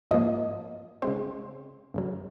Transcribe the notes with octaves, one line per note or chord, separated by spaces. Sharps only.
G#2 F3 A#3 D#5
C#3 G#3 C4 C5
F#2 C#3 F#3